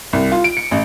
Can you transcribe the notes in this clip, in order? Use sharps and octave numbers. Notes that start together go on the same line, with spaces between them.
C2
F4
D7
C#7
A1